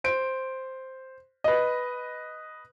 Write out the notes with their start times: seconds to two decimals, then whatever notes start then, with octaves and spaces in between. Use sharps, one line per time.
0.04 C5 D7
1.44 B4 D#5